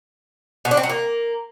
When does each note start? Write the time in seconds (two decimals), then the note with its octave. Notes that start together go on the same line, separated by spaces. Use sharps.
0.65 B2
0.71 D4
0.77 C4
0.83 F#3
0.90 A#3